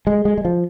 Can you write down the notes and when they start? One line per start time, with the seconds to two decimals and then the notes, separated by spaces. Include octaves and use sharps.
0.07 G#3
0.25 G#3
0.38 G#3
0.45 F3